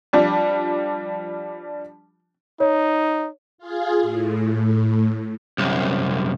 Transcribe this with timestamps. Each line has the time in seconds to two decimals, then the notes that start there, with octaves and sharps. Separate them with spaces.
0.13 F3 G3 D4
2.60 D#4 C#5
3.58 F4 G#4
4.02 A2
5.58 C2 F#2